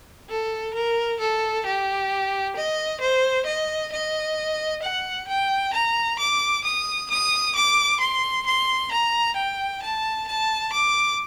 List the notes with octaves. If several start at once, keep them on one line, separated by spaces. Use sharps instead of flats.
A4
A#4
A4
G4
D#5
C5
D#5
D#5
F#5
G5
A#5
D6
D#6
D#6
D6
C6
C6
A#5
G5
A5
A5
D6